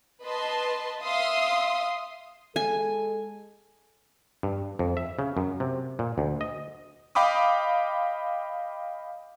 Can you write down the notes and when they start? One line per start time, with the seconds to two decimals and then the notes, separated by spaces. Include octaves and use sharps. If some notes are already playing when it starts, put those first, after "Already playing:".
0.25 B4 D#5 A5 C6
1.01 E5 F5 C6 D#6
2.56 G#3 A4 G#5
4.43 G2
4.79 F2
4.97 E5
5.19 C#3
5.37 F#2
5.60 C3
5.99 A#2
6.18 D2
6.41 D#5
7.15 D#5 F5 G5 B5 D6 D#6